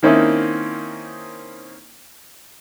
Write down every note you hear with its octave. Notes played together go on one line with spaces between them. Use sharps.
D#3 A#3 C4 C#4 D#4 E4